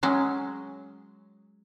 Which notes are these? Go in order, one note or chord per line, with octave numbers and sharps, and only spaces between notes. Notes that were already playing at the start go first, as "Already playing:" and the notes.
F#3 G#3 C#4